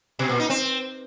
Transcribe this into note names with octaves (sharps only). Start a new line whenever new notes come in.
B2
A#2
D#4
C4